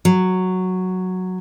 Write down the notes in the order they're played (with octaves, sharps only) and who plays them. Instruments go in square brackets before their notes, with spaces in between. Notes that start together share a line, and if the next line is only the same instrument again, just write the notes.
[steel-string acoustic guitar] F#3